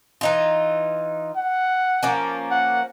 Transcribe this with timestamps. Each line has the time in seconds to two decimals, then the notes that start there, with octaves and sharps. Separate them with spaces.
0.21 E3 D#4 F4
1.37 F#5
2.03 F3 A#3 C#4
2.51 F#5